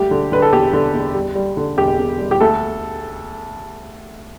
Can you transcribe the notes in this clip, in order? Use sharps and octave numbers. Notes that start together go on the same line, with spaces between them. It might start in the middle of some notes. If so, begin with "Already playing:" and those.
Already playing: D2 G3 G4
D3
D3 B4
A4
E2 G4
D3
E2
G3
G3
D3
E1 G4
E1
G3
G4
D2 A4